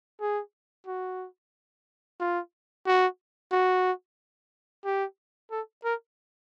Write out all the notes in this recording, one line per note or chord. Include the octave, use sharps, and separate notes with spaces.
G#4
F#4
F4
F#4
F#4
G4
A4
A#4